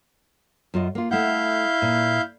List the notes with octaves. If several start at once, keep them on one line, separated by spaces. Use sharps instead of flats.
F#2 F4 D#5
A#3 F4
A3 E4 F5 F#5 G6
A#2